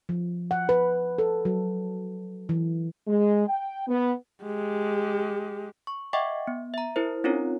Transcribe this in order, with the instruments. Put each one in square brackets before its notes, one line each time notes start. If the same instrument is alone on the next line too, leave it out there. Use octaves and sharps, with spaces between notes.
[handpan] F3
F#5
B4
A4
F#3
E3
[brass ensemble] G#3
G5
B3
[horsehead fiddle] G#3 G4
[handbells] C#6
D#5 E5 F#5 G5 C#6 D6
B3
E5 A#5
E4 A#4 C5
C4 C#4 D#4 F4 A#4 C#5